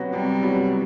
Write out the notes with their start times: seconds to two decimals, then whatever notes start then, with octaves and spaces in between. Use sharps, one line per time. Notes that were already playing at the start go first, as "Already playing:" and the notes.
Already playing: C3 F#3 B3 F#4
0.13 C3 G3
0.43 F#3 B3 F#4